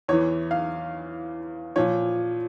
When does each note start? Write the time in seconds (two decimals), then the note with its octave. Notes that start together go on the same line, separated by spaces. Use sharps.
0.08 E2 E3 C#5
0.51 F5
1.76 A#2 F3 C#5